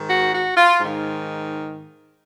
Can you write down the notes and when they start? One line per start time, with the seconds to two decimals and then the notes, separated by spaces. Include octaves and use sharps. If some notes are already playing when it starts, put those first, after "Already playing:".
Already playing: G#2 D#3
0.09 F#4
0.33 F#4
0.56 F4
0.78 G#2 D#3